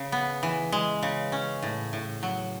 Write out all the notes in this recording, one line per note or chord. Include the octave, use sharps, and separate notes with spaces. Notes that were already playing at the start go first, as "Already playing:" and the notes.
Already playing: C#3
B3
E3
G#3
C#3
C#4
A2
A2
F#3